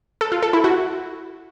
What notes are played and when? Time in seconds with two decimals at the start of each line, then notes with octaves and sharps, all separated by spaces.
0.21 A4
0.32 F4
0.43 A4
0.53 E4
0.64 F#4